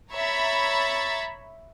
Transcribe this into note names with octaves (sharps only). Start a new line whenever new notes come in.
C#5 E5 A#5 B5 A6